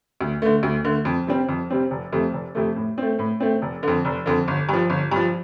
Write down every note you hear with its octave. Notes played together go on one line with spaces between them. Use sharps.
D2
D3 A3
D2
D3 A3
F2
C3 G3 C4
F2
C3 G3 C4
F1
F2 C3 A3
F1
F2 C3 A3
A2
A3 C4
A2
A3 C4
F1
F2 D3
F1
F2 D3
G1
G2 F3
G1
G2 F3